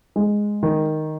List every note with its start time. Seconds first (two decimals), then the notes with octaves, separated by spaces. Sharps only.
0.16 G#3
0.63 D#3